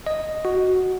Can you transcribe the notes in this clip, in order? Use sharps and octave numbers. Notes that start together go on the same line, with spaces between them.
D#5
F#4